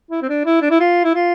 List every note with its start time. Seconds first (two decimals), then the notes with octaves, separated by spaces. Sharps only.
0.11 E4
0.22 C4
0.29 D4
0.45 E4
0.62 D4
0.70 E4
0.80 F4
1.04 E4
1.15 F4